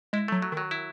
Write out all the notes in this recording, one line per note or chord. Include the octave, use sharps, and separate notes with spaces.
G#3 E4
F#3 A3
F#3
D#3
F#3
E4